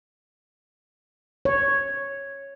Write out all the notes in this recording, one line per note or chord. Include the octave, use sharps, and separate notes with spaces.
C#5